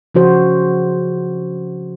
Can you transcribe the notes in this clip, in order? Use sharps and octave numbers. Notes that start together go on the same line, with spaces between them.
C#3 F3 F#4 C5